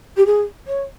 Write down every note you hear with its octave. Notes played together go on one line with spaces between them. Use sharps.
G4
G#4
C#5